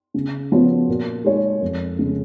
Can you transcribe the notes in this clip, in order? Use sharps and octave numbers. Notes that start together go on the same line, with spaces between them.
C#3
F3 B3 F#4 C#5
A#2
G#3 D#4 G#4 C#5
F2
C#3 G#3